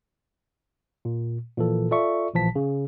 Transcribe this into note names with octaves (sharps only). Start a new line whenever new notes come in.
A#2
A#2 E3 F3 A4
F4 A4 D5 E5 C#6
A1 A#2 E3 F3 A5 B6
C#3